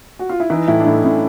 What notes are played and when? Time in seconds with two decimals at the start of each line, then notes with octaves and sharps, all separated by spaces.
0.19 F#4
0.29 F4
0.40 E4
0.50 E3 D#4
0.68 A2 E4
0.80 D4
0.86 A2 D#4
1.04 A2 C#4